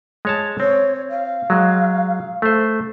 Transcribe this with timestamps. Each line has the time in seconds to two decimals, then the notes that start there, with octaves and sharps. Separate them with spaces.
0.25 G#3 C#5 A5
0.60 C4 C#5
1.10 F5
1.50 F#3 G#3
2.42 A3 C5